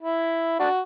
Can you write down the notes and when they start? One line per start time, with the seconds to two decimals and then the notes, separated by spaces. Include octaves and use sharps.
0.03 E4
0.60 D4 F#4